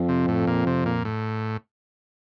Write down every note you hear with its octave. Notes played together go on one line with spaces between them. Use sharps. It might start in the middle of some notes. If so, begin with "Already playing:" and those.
Already playing: F2
C3
A2
A#2
C3
A#2
A2